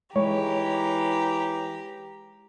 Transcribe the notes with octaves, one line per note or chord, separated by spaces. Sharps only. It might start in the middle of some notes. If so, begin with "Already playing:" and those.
E3 G#3 G4 C#5 A#5